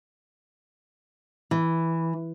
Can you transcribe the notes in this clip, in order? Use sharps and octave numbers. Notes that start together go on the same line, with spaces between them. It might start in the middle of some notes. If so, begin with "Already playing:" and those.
E3